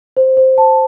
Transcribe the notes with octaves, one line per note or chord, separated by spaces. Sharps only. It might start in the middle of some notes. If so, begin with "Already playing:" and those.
C5
C5
A5